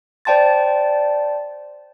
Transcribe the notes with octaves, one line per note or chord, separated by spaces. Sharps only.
C5 D5 G5 A5 C6 A6